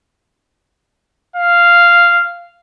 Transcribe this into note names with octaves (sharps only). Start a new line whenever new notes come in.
F5